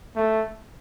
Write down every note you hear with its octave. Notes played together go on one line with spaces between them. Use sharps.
A3